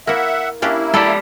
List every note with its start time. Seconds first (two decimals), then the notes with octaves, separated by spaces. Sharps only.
0.07 A#3 E4 E5 F#5
0.62 A#3 C#4 D4 E4 G4
0.94 G#3 G4 A4 D5 A5 B5 E6